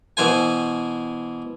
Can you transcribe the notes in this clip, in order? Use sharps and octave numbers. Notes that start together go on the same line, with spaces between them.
B2 E3 C5 G#5